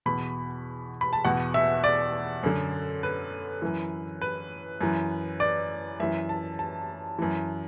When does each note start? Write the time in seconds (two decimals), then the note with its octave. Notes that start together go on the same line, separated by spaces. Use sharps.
0.06 E2 B2 B5
1.01 B5
1.13 A5
1.25 E2 B2 F#5
1.54 E5
1.84 D5
2.43 F#2 D3
3.03 B4
3.62 F#2 E3
4.21 B4
4.81 F#2 E3
5.40 D5
6.00 F#2 E3 E5
6.29 A5
6.59 A5
7.19 F#2 E3